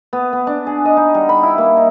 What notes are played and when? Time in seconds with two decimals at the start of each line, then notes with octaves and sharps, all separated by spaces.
0.13 B3
0.33 B3
0.47 D4
0.67 G#4
0.85 D#5
0.97 D#4
1.14 G3
1.29 B5
1.43 E4
1.58 A#3
1.77 D#4